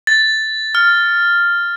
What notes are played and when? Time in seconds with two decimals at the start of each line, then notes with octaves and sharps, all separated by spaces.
0.07 A6
0.75 F6